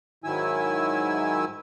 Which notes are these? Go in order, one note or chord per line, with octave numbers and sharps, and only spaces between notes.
G#2 D#3 F#3 E4 G#5 E6